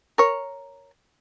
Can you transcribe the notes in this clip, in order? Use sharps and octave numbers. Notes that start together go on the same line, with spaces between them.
A#4 C#5